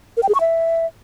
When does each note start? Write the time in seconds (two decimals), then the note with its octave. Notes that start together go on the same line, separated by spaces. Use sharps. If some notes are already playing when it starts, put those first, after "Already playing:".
0.17 A#4
0.23 G5
0.29 G#4
0.35 C#6
0.40 E5